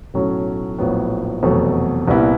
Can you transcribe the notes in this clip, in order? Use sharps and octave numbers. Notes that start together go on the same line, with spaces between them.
B1 A2 F#3 A3 C#4
A#1 A2 F#3 B3
F1 E2 B2 F#3 A3
C2 A#2 G3 B3 E4